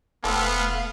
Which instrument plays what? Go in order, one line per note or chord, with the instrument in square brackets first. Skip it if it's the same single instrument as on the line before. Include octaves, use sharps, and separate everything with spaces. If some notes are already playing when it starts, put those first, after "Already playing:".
[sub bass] E1 [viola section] A3 F5 [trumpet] B3 [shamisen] C4 E4 A4